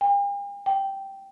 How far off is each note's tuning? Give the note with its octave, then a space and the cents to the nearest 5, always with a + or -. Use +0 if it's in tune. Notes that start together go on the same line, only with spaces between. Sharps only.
G5 +45
G5 -5